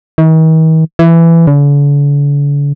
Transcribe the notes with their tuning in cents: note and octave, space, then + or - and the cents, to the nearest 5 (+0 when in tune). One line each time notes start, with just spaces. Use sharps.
D#3 +45
E3 +15
D3 -45